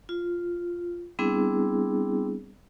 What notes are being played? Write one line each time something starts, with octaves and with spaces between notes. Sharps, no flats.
F4
G3 B3 C4 D4 E4 G#4